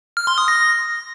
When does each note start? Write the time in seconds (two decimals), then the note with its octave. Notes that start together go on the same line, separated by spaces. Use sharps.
0.17 F6
0.27 C6
0.38 D#6
0.48 A#6